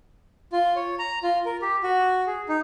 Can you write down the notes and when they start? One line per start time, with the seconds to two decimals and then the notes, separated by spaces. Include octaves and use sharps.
0.52 F4
0.76 C#5
0.99 A#5
1.23 F4
1.45 A#4
1.62 G4
1.83 F#4
2.27 G#4
2.49 D#4